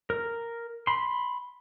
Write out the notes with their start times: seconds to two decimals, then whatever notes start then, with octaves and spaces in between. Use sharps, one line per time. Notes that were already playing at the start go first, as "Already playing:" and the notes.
0.10 A#4
0.87 B5 C6